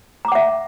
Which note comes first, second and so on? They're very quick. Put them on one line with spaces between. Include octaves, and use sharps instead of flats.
A#5 D6 F#5 E5